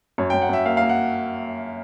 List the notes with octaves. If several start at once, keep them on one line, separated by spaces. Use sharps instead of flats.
F#2 C#5
G5
F#2
F#5
F#2 E5
A#3 F5
F5
A#3
F#5